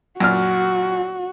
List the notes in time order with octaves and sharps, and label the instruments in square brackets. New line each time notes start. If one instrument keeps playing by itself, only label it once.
[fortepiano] F#2 A#2 F6 [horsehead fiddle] F#4